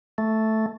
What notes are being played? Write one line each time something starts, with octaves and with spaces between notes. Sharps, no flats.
A3